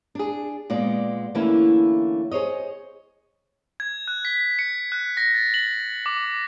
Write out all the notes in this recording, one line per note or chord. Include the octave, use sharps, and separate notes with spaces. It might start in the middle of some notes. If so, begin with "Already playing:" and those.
D4 G#4
A#2 G#3 B3 D5
D3 E3 A3 A#3 C#4 E4
G#4 C5 C#5 D#5
G#6
F#6
B6
C#7
F#6
A#6
A6
F#7
D6